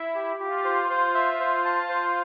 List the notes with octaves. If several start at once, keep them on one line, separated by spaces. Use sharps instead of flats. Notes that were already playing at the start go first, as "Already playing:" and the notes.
Already playing: E4 E5
G4
F4 G4
C5
C5
E5
C5
A5
C5